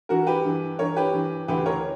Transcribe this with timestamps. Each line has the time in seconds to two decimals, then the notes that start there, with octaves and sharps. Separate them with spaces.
0.09 G2 E3 F#4 A#4
0.27 G4 B4
0.44 G2 E3
0.79 G2 E3 A#4 C#5
0.96 G4 B4
1.13 G2 E3
1.48 D2 C#3 E3 G4 B4
1.66 A#4 C#5